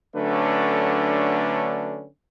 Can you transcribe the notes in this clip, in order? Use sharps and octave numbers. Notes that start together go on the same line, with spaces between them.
D3 F#3 A3 C#4 D4 B4